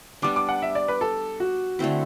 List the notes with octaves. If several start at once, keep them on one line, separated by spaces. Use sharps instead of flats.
G3 B3 D4 D6
D6
F#5
E5
D5
B4
A4
F#4
D3 A3 C4 E4